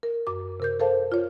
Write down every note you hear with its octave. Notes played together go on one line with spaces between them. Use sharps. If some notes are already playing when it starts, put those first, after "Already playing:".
A#4
F#2 D6
C3 A#4 G6
A4 A#4 C5 F5 A5
F4 C#5